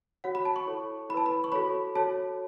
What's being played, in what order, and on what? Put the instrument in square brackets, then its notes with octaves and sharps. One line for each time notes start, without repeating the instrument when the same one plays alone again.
[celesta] F#4 C#5 F#5
B5
A5
C#6
E4 A4 C#5
E4 B5
B4 A5
B5
C#6
F#4 A4 C#5 B5
F#4 A4 C#5 A5